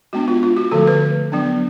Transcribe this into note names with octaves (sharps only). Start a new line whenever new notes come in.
G#3 B3 D4 F#4
F4
F4
F#4
D3 F3 A3 A4
B4
F#3 B3 D4